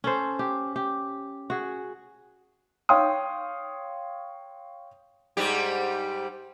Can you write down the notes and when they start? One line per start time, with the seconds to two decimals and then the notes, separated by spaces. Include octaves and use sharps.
0.04 C#4 A4 C5
0.39 G4
0.76 G4
1.50 F#4 G#4
2.89 C#5 F5 G5 C6 D#6
5.37 G#2 G3 G4